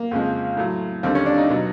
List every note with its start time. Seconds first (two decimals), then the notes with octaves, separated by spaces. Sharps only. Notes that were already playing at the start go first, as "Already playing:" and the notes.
Already playing: A#3
0.11 F2 C#3 F3 G#3
0.57 A2 F#3
1.03 D#2 D3 G3 C4
1.15 C#4
1.26 D4
1.38 D#4
1.50 B2 F#3